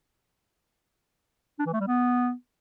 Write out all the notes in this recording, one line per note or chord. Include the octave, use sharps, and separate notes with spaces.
D4
E3
A3
G3
B3